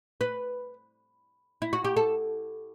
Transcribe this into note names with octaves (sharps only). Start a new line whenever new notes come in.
B4
E4
F#4
G4
A4